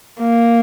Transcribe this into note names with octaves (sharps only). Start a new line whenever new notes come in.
A#3